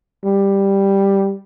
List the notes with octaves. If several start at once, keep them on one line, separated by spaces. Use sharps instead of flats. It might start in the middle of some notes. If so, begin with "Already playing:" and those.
G3